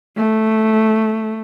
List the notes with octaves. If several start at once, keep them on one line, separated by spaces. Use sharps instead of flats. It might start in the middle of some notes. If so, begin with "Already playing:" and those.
A3